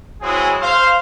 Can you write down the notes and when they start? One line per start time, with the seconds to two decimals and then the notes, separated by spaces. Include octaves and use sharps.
0.21 F#3 G#3 C4 E4 F#4 G#4
0.61 C5 F5